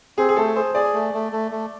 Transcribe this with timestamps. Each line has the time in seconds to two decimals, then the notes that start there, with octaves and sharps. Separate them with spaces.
0.18 C4 G#4
0.29 G#4
0.37 A3 A4
0.55 G#4 C5
0.74 G#4 D5
0.94 A3
1.14 A3
1.32 A3
1.51 A3